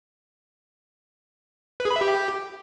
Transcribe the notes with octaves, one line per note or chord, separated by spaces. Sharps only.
B4
G#4
B5
E5
G4